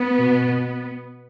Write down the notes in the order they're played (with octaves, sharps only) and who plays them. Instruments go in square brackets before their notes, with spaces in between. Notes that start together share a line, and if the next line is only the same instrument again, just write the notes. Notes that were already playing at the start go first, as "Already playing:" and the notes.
Already playing: [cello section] B3
B2